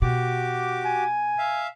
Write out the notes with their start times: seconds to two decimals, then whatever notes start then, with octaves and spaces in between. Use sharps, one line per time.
0.02 B2 F#4 G4 D6
0.85 G#5
1.38 E5 F5